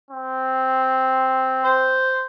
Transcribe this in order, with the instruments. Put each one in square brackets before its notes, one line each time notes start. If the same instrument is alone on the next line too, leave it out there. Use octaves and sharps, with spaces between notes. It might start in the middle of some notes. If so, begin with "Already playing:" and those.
[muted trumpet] C4
[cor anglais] C5